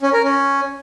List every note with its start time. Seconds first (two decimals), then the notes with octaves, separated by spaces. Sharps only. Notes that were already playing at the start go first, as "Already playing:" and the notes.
0.02 C#4
0.13 A#4
0.24 C#4